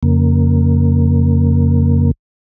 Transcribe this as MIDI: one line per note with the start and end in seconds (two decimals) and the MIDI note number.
0.03 2.11 41
0.03 2.11 49
0.03 2.11 58